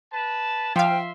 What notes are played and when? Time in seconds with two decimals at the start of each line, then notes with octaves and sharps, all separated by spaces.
0.12 B4 A5
0.76 F3 E5 F5 G5 C6